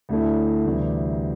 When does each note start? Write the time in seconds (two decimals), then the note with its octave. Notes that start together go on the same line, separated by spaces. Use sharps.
0.09 D2 D3 A3 E4
0.65 D2 C3 E3 G3